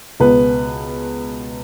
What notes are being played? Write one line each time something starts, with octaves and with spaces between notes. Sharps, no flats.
C#2 B2 B3 B4